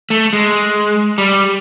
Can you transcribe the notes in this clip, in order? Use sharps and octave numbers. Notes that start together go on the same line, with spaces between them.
A3
G#3
G3